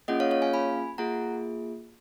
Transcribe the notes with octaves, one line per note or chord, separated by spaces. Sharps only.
A#3 C#4 F4 G#4 D#5 F#5
C#5 F5
C#5 F5
F5 G#5
G#5 B5
A#3 F4 G#4 F#5 A#5